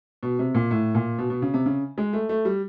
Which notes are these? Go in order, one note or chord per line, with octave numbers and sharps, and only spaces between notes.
B2
C3
A#2
A2
A#2
B2
B2
C#3
C3
C#3
G#3
A3
A3
G3